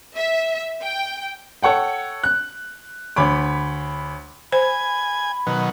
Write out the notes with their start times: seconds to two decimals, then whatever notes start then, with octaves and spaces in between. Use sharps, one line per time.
0.15 E5
0.83 G5
1.63 A4 C#5 F#5 G5
2.24 F#6
3.16 D2 C#5 B5 D6
4.52 C5 G#5 B5
5.47 B2 D#3 F#3